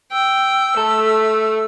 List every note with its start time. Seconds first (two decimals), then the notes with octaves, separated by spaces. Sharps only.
0.12 G5 E6
0.77 A3 A4